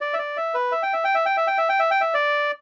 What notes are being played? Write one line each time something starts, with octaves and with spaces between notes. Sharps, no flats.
D5
E5
D5
E5
B4
E5
G5
E5
G5
E5
G5
E5
G5
E5
G5
E5
G5
E5
D5